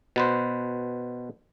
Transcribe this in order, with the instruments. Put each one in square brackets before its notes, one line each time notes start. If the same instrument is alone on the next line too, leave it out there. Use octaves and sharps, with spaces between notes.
[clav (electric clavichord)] B2 B4 C5